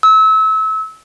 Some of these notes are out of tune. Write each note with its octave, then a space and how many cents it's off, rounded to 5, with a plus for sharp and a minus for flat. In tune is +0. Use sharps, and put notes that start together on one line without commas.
E6 -30